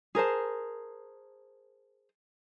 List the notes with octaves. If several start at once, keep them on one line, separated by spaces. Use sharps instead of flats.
G#4 A#4 C5 A5